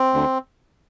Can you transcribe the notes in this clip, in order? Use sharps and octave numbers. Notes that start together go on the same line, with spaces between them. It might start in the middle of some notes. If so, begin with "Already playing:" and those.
Already playing: C4
D2 D3